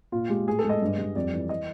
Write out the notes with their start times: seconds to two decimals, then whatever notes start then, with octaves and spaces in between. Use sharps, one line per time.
0.12 A#2 F4
0.29 G#3 G4
0.47 A2 G#4
0.59 A4
0.64 G#3 D#5
0.82 G2
0.98 G3
1.15 F2 D5
1.33 E3
1.49 D#5